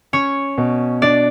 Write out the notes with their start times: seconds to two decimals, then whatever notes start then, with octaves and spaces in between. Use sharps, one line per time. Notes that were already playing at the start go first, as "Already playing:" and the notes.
0.13 C#4 C#5
0.58 B2
1.02 D4 D5